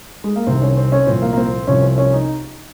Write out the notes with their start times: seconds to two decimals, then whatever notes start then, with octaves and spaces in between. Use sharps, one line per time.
0.24 G#3
0.35 A#3
0.47 C2 C3 D#3 C4
0.62 C#4
0.77 C4
0.92 C#4
1.07 C2 A#2 F3 C4
1.22 A#3
1.33 A#3
1.37 C4
1.67 C2 C3 F3 C#4
1.83 C4
1.98 C#4
2.13 D#4